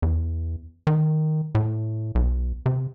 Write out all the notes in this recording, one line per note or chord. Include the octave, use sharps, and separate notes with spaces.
E2
D#3
A2
B1
C3